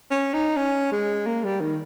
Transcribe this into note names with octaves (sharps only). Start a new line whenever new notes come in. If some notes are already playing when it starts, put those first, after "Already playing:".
C#4
D#4
C#4
G#3
A#3
G3
D#3